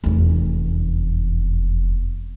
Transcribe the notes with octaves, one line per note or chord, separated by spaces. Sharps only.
F1 E2